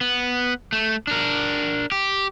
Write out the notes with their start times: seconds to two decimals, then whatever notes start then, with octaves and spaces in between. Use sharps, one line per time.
0.01 B3
0.72 A3
1.07 D4 A#4
1.92 G4